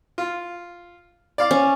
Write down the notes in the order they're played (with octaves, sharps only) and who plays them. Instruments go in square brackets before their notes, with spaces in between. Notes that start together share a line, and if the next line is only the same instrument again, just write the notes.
[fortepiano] F4
D5 F5 D6
[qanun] C#4